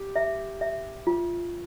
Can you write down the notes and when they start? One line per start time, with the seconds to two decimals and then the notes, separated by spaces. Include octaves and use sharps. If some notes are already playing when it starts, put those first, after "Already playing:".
Already playing: G4
0.16 E5
0.61 E5
1.07 F4